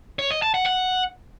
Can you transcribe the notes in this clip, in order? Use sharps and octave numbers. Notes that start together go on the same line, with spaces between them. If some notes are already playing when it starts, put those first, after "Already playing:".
C#5
D#5
A5
F#5
F#5